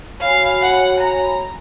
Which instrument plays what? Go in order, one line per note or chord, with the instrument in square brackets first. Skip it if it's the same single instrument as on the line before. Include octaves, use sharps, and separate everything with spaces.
[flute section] F#4 C#5 G#5 B5 [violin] F5
[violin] F#5
A#5